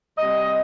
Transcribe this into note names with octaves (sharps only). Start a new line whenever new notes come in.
C3 G3 D#5